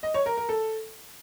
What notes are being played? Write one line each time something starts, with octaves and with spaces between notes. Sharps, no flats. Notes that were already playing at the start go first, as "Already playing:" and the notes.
D#5
C#5
A#4
A#4
A4